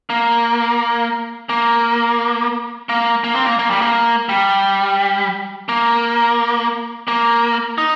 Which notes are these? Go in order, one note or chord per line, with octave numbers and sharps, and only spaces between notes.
A#3
A#3
A#3
A#3
C4
A#3
A#3
G3
A#3
G3
A#3
A#3
D#4